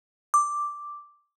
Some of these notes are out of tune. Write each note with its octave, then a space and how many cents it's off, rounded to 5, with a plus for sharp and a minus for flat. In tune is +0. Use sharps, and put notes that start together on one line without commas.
D6 +0